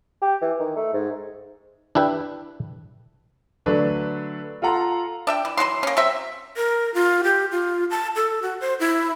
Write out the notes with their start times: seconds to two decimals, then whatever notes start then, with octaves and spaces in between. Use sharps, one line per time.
0.22 G4
0.41 E3
0.59 D#3
0.76 A3
0.93 G#2
1.95 D4 E4 G4 B4
3.66 D3 F#3 A3 D4 B4 A5
4.62 F4 A4 F#5 A#5 C6
5.27 D4 E5 G5
5.45 E3
5.57 E3 F#3 F#4 C6
5.83 A#3 C#4
5.97 F#3 C4 E5
6.57 A#4
6.94 F4
7.24 G4
7.52 F4
7.91 A5
8.16 A4
8.42 F#4
8.61 C5
8.80 E4